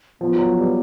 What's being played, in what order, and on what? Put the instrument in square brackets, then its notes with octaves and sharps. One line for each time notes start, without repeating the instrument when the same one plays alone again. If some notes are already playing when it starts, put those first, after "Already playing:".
[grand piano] F3 [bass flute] B3
[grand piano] F#3
F3
G3